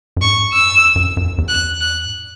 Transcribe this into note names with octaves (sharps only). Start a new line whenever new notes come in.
F#2
G#2 C#6
F#2 E6
E2
F#2
F#2
E2
E2
F#6
F#6
G#2